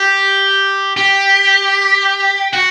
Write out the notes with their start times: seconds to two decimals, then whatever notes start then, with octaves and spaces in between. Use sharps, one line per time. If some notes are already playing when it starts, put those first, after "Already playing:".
Already playing: G4
0.97 G4
2.53 F#4